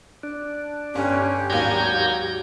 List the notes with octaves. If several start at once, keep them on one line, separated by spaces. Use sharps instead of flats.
D4
G1 C#4 G4
G#1 D#2 F#3 A#5 G6 G#6